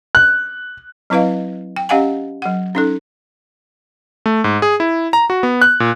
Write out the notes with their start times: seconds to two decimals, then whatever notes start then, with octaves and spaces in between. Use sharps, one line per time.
0.15 F#6
1.10 F#3 C4 E4 B4 D#5 F5
1.76 G5
1.89 C#4 G4 D#5 F5 F#5 G#5
2.42 F#3 F#5
2.75 C#4 D#4 A4
4.26 A3
4.44 G#2
4.62 G#4
4.80 E4
5.13 A#5
5.30 F#4
5.43 B3
5.62 F#6
5.80 A#2